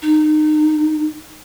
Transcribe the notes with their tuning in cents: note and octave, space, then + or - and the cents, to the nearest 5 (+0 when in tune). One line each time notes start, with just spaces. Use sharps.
D#4 -25